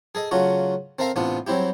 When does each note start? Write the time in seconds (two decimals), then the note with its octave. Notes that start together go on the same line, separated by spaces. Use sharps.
0.15 G#4 A4 D#5
0.31 C#3 F#3 A3 F4 F#4
0.99 C4 A4 A#4 E5 F5 A#5
1.16 A1 C3 B3 D4 F4
1.47 F#3 G3 C4 E4 G4